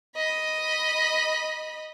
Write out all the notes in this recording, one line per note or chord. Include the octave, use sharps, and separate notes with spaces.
D#5 B5